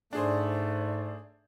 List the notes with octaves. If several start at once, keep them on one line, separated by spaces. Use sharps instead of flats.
G#2 A3 D4 G#4 C5 D5